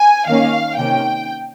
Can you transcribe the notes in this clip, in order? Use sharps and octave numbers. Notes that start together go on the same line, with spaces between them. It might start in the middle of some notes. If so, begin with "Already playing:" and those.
Already playing: G#5
D#3 A#3 C#4 F5
C3 D#3 A#3 C#4 G5